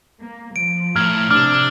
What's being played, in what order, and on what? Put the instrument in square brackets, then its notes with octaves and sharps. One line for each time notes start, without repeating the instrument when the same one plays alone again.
[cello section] A#3
[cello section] F3 [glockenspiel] D7
[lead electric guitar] A2 [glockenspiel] A#5 G#6 G7 [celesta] F6
[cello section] C3 [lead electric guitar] D4 [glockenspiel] D6 E6 [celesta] F6